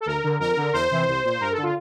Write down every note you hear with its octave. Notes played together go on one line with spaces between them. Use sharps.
A4
D2 A#4
D3
F2 A#4
D3
E2 C5
C3 E3
C2
A#2
G2 A#4
A4
D3
F4